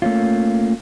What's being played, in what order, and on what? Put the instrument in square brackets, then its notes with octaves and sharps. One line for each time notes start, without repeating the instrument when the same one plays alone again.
[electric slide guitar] A3 A#3 C#4 F4